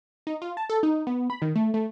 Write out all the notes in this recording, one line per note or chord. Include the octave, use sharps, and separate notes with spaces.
D#4
F4
A5
A4
D#4
B3
B5
D#3
A3
A3